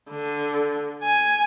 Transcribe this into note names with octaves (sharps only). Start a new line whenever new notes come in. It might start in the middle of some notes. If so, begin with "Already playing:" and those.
D3
G#5